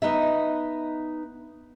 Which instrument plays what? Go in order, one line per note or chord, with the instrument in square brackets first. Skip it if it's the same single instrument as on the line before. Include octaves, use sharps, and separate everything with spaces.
[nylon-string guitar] B3 D#4 D#5 E5